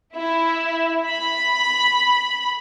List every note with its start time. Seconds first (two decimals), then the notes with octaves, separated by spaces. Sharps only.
0.16 E4
1.07 B5